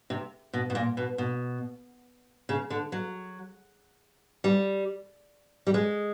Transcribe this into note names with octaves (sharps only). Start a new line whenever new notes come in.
C3
B2
B2
A#2
B2
B2
C#3
D3
F#3
G3
G3
G#3